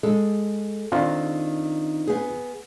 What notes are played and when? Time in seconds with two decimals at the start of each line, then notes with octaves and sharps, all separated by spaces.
0.03 G#3 A4
0.92 D#3 C4 D4 F4
2.08 B3 G#4